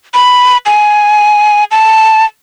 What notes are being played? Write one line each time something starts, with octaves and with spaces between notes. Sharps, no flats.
B5
G#5
A5